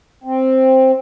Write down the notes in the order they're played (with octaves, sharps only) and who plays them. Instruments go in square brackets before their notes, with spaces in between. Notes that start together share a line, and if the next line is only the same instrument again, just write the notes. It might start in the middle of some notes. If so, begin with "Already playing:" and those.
[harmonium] C4